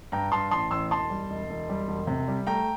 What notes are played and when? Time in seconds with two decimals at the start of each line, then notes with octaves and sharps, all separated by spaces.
0.12 G2 G5 A#5
0.32 G2 A5 C6
0.51 A1 A5 C6
0.71 A1 C6 E6
0.90 E1 A5 C6
1.10 G3
1.30 E1
1.50 E1
1.69 G3
1.88 E1
2.07 C3
2.28 G3
2.47 A3 G5 A#5